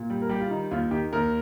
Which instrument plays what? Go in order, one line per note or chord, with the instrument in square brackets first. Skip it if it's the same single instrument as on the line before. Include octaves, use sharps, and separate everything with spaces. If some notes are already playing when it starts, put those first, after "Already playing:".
Already playing: [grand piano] A#2
G3
A#4
G3 G4
F4
D#3 D#4
D#2 F4
D#3 G4
D#2 A#4